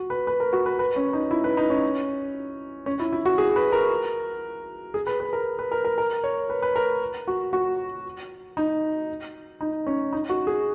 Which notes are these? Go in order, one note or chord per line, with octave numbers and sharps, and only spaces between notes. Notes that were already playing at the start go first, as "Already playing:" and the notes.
Already playing: F#4
B4
B4
A#4
F#4
B4
B4
C#4
D#4
E4
B4
D#4
C#4
C#4
E4
E4
F#4
G#4
B4
A#4
G#4
B4
B4
A#4
B4
A#4
A#4
A#4
C#5
B4
B4
A#4
F#4
F#4
D#4
D#4
C#4
D#4
F#4
G#4